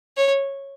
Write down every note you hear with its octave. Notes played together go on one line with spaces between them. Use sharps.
C#5